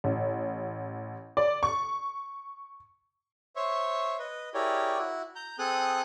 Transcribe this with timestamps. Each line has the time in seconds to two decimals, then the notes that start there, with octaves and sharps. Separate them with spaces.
0.04 A1
1.37 D5
1.63 C#6
3.56 C5 C#5 E5 C#6
4.19 B4 D#5
4.54 E4 G4 G#4 A#4 C#5 D5
4.98 E4 F#4
5.36 A#5 G6
5.59 C4 G#4 A4 D#6 F#6